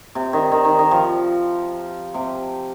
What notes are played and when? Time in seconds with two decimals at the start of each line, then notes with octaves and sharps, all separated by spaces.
0.15 C3
0.33 D#3
0.52 D#3
0.65 D#3
0.79 D#3
0.91 F3
2.14 C3